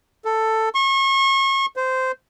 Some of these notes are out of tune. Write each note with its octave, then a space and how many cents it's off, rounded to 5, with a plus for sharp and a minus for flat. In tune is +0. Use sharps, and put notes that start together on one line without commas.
A4 +10
C#6 -35
C5 -15